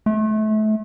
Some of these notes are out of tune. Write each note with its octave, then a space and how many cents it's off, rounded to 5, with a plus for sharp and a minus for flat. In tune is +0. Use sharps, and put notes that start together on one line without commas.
A3 -30